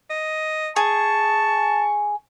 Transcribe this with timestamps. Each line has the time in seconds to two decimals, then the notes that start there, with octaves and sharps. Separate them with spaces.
0.10 D#5
0.76 G#4 A5 C#6